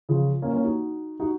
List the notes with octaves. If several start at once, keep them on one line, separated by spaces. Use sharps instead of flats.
C#3 F3
A#3 C#4
A#3 C#4
D#4 F#4
D#4 F#4